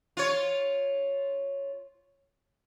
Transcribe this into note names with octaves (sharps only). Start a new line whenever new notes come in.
F4 C#5